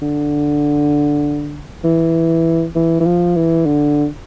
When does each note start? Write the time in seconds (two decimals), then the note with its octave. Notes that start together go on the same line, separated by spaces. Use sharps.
0.02 D3
1.84 E3
2.75 E3
3.00 E3
3.05 F3
3.36 E3
3.66 D3